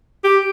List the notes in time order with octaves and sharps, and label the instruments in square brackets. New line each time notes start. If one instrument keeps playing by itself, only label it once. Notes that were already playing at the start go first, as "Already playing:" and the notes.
[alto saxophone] G4